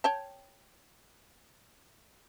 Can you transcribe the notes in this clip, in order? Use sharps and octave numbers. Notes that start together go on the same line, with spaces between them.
C#5 G5 A5